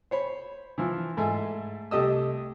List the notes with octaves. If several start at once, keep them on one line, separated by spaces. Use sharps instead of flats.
C5 C#5 B5
E3 F3
G#2 A3 E5 G#5
C2 A3 G4 D#5 D#6 E6